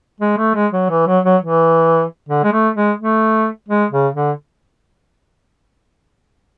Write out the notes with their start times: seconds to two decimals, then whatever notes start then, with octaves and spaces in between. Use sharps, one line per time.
0.20 G#3
0.38 A3
0.55 G#3
0.73 F#3
0.90 E3
1.07 F#3
1.25 F#3
1.42 E3
2.29 D3
2.44 G#3
2.53 A3
2.76 G#3
2.99 A3
3.69 G#3
3.92 C#3
4.15 D3